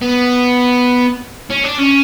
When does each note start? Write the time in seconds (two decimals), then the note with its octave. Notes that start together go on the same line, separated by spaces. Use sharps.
0.02 B3
1.51 C#4
1.65 D4
1.79 C#4